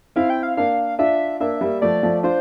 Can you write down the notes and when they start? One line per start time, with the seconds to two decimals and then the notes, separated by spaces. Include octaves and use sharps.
0.16 C4 E4 F5
0.30 G5
0.43 F5
0.57 A#3 D4 F5
0.99 D4 F4 E5
1.40 A#3 D4 E5
1.61 G3 A#3
1.82 F3 A3 D5
2.03 F3 A3
2.23 D4 F4 C5